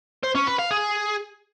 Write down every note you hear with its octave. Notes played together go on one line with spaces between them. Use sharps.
C5
C#4
B4
F5
G#4